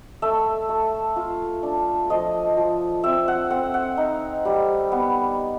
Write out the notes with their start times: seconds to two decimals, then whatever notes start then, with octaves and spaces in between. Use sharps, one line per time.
0.22 A3 E5
0.69 A3
1.16 F4
1.63 D4
2.10 F3 D#5
2.57 F3
3.04 C4 E5
3.28 F#5
3.50 C4 F#5
3.74 F#5
3.97 D#4
4.45 G3
4.92 B3